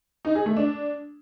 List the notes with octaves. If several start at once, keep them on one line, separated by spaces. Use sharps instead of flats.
D#4
G#4
A3
D4